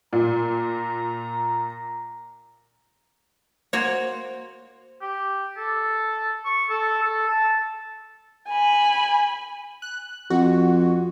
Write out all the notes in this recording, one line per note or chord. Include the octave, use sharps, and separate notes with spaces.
A#2 A#5
A#3 F#4 C5 C#5
G4
A4
C#6
A4
A4
A5
G#5 B5
F#6
F2 F#4